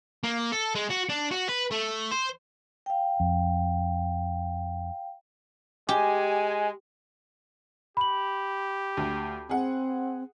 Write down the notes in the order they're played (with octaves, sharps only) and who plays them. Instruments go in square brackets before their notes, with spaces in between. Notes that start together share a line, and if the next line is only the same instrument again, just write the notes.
[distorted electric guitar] A#3
A4
G#3
F#4
D4
F#4
B4
A3
C5
[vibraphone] F5 G5
[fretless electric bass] F2
[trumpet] G#3 [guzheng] G4 [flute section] G#5
[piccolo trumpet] G4 [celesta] B5 F#7
[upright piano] D2
[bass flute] C4 [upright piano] G#4 F#5